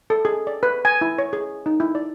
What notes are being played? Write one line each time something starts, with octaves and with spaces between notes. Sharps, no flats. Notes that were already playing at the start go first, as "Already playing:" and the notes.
A4
G#4
D5
B4
G#5
E4
C#5
G#4
D#4
E4
D5